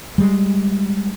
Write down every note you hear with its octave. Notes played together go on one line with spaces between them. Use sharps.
G3 G#3